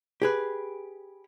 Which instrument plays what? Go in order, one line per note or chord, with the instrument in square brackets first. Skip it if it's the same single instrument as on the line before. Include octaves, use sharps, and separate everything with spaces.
[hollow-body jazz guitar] G4 G#4 B4